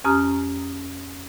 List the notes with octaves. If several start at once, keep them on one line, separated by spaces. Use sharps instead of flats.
F2 C#4 G4 A#5 D#6 F6